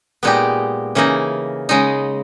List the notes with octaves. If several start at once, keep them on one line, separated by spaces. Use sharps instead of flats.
A#2 G#3 B3 D#4 G4
C#3 E3 A#3 D#4
C#3 G#3 D#4